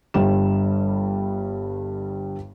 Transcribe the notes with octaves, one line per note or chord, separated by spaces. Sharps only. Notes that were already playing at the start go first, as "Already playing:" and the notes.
G1 G2 G3 E7